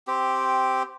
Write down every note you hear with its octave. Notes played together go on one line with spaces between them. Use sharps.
C4 G4